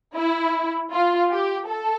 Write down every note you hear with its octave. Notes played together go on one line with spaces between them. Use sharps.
E4
F4
G4
A4